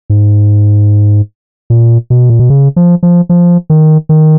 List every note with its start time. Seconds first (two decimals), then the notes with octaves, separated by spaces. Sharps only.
0.10 G#2
1.70 A#2
2.10 B2
2.30 A#2
2.39 B2
2.50 C#3
2.76 F3
3.03 F3
3.29 F3
3.70 D#3
4.09 D#3